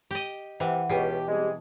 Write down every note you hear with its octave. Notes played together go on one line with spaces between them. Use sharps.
G4 D#5
C3 E3 F#5
C#2 B2 G4
G3 G#3 C4 G4 G#4